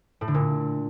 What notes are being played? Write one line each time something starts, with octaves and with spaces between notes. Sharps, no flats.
A2
D3
A#2